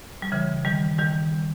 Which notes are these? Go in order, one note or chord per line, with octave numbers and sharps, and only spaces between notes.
G3
C#3 E3
D#3 G3
D#3 G3